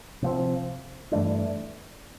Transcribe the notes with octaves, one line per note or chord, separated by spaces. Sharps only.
C3 F3 C4
G2 E3 A3 D4